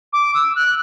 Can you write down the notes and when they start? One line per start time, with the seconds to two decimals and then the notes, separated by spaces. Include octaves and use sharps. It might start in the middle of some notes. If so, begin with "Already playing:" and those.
0.13 D6
0.34 E6
0.56 F#6